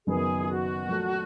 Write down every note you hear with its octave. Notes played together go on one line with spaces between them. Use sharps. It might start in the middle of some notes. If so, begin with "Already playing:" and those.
F#1 F#2 D#3 F#3 B3 G#4
F4
F#4
A#2 F#3 A3